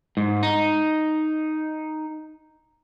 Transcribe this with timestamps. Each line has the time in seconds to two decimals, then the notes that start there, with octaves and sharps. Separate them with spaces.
0.17 G#2
0.43 D#4